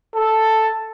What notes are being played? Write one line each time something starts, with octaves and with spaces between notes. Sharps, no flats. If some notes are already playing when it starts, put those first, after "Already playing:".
A4